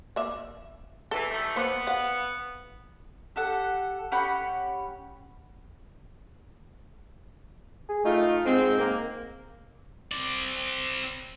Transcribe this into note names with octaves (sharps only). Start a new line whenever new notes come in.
A#3 E5
E3 A4
D#3 G3 A3
A#3 B3 C5
F5 F#5
G4 A4 F#5
C#4 G4 F#5 B5
G#4
A3 D#4 F4
G#2 G#3 C4
A#3
C4 D5